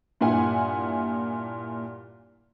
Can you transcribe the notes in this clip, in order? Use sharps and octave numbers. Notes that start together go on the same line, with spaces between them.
G2 A#2 E4 F#5 G#5